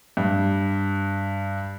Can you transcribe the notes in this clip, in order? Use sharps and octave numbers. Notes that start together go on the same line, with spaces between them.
G2